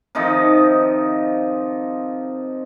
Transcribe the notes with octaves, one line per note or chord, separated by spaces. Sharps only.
C3 D#3 F3 D#4